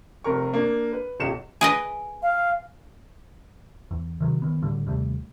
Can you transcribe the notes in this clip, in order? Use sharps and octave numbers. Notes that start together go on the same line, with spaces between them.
F1 A#4 C#6
A#3 D4
B4
D#1 B1 B2 C#7 E7
G#4 B4 D#5 G#5
F5
E2
C3 D#3 F#3
D#3 B3
A2 D3 G3
D#2 C3 G3 A3